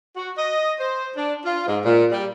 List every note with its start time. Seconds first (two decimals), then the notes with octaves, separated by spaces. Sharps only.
0.17 F#4
0.38 D#5
0.80 C5
1.16 D4
1.45 F4
1.67 G#2
1.85 A#2
2.12 G3